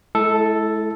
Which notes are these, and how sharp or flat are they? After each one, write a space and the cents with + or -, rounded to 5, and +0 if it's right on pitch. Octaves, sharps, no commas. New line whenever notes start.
G#3 +45 E4 +0 A4 +0